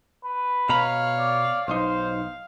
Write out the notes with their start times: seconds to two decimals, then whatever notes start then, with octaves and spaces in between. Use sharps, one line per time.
0.25 B4
0.69 B2 C#5 F5 A#5 B5
1.16 D5
1.68 B1 D#4 C5 F5